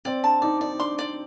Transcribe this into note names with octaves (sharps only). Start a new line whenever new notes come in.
C4 D5
D4 A5
D#4 D5
D#4 D5
D4 C6
D5